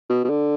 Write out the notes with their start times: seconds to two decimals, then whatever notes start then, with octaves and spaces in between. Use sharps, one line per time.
0.10 B2
0.24 B2
0.29 D3